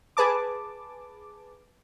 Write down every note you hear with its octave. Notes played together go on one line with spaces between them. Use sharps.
G#4 B4 A5 D6